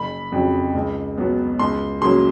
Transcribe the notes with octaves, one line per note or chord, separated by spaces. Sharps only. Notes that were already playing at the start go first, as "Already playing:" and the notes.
Already playing: F#1 B5
F2 C#3 F#3
C#2
B2 F#3 B3
C#2 C6
C#3 F#3 A#3 C6